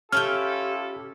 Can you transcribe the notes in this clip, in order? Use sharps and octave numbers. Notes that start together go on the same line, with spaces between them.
C#4 E4 F4 G4 A4 E5 G5 F6